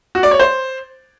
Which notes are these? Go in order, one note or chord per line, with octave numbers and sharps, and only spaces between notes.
F#4
D5
C#5
C5